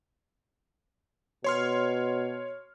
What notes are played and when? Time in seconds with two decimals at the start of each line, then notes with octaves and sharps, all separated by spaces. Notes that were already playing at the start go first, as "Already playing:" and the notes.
1.44 B2 C#5 C6 F6